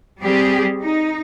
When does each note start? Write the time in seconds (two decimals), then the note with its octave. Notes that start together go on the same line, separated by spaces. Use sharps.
0.21 G3 C4 G4 G#4
0.83 D#4